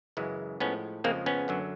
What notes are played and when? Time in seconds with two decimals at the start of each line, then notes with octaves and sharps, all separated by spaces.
0.17 F#2 C#3 E3 G#3
0.60 A2 F3 G#3 B3 C#4
1.04 F2 C#3 F3 G#3 A#3 C4
1.26 B3 C#4
1.48 F#2 D3 F#3